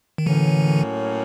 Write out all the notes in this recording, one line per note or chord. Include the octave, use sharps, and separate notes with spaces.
D#3
A2 D3 E3 F#3 A#3 C#4